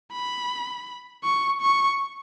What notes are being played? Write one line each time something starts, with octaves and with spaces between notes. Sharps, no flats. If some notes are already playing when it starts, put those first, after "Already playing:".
B5
C#6
C#6